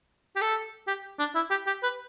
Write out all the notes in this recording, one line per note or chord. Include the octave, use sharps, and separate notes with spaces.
G4
A4
G4
D4
E4
G4
G4
B4